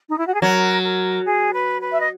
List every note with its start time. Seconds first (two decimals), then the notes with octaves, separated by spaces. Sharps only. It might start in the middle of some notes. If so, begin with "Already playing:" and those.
0.10 D#4
0.17 E4
0.26 F#4
0.34 G#4
0.41 F#3 A#4
0.83 A#4
1.26 G#4
1.53 B4
1.81 B4
1.91 E5
1.99 D#5